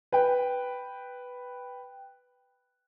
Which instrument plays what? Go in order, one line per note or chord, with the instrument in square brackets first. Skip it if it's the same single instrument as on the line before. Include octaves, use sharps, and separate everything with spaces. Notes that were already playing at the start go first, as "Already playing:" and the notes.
[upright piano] B4 G5